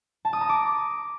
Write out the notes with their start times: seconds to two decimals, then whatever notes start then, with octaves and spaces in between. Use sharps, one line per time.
0.25 A5
0.33 D#6
0.41 A#5
0.49 D6